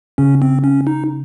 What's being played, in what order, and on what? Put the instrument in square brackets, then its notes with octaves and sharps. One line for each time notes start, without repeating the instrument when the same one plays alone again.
[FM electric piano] C#3 [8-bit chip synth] C#4
[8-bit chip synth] C4
C#4
D#4